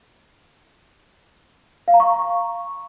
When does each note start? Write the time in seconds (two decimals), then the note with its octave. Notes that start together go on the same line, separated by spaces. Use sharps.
1.88 F5
1.94 A#5
2.00 C#6